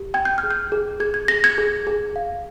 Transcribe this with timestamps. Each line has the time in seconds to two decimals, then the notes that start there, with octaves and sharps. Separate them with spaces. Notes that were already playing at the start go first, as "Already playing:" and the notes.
Already playing: G4
0.14 G5 G#6
0.25 G6
0.38 F6
0.43 G#4
0.51 G6
0.72 G#4
1.00 G#4 G#6
1.14 G#6
1.28 G#4 A#6
1.44 G#6
1.58 G#4
1.87 G#4
2.16 F5